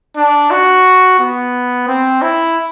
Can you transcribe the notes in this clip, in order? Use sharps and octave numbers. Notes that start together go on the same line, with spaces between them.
D4
F#4
B3
C4
E4